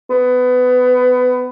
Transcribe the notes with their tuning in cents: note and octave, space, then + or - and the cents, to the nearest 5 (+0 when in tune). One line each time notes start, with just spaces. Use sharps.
B3 +20